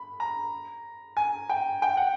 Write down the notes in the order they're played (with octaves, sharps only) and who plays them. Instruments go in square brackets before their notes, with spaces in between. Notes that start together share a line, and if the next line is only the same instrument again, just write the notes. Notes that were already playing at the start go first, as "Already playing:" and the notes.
Already playing: [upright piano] B5
A#5
G#5
G5
G5
F#5